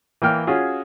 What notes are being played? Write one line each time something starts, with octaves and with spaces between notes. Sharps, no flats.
E3 A#3 G5 F6
C#4 F4 F#4 G#4